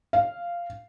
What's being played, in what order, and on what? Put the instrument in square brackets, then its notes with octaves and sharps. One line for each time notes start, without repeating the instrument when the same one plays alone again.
[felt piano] F5